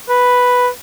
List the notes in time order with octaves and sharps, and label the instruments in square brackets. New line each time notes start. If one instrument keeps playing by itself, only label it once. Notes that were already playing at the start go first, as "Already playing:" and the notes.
[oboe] B4